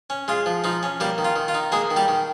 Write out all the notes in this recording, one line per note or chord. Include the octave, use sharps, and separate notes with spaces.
C#4
G#3 F4
F3
F3 D#4
C#4
G3 A#3 G4
D#3
F4
D#3
F4
D#4
G#3 A#3 G#4
D#3
G3 G4
D#3